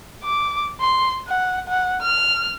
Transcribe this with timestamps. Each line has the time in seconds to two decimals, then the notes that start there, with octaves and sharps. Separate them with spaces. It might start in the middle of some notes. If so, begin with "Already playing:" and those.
0.24 D6
0.81 C6
1.27 F#5
1.68 F#5
2.02 F6